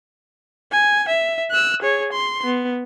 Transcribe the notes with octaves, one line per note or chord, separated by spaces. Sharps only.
G#5
E5
E6 F#6
G#4 C#5
C6
B3